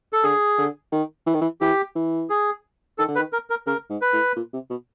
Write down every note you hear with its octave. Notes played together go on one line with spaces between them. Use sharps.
A4
D3 G#4
D3
D#3
E3
D#3
E3
E3 G4
E3
G#4
D#3 A4
D3
B4
D#3
A#4
A#4
C#3 A#4
G#2
B4
A2
A#2
C3
B2